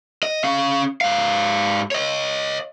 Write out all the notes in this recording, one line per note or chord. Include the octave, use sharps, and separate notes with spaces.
D#5
C#4 F5
G#2 F5
C#5 D#5